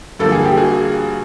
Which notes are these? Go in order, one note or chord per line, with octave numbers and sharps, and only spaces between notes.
G2 D3 F3 A#3 A4
G#4
G4
F#4 G#4